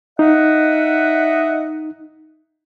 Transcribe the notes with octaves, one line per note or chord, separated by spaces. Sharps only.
D#4 D#5 E5 F#5